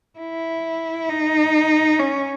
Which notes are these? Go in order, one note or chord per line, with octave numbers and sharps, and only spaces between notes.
E4
D#4
C#4